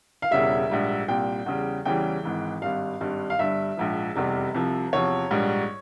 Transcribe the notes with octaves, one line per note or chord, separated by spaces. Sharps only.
F5
E1 E2 C#3 G3 E5
A#1 G#2 G3
C2 A#2 G3 G5
E2 C#3 G3
E2 C#3 E3 G3 G5
G#1 G#2 E3
G#1 G2 G3 F5
G#1 G2 G3
F5
G1 G2 G3 E5
A#1 G#2 F3
F1 E2 C3 G3
C2 C3 F3
E2 C3 F3 C#5
A#1 G#2 G3